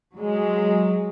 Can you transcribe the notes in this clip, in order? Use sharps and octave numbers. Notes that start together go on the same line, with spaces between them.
F#3 G#3